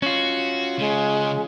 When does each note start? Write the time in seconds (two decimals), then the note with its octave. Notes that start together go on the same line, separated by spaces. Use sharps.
0.02 C#4 F4 F#4
0.78 C#3 G#3